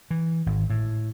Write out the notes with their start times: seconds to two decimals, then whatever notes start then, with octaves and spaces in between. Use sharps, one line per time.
0.11 E3
0.46 G#1
0.70 A2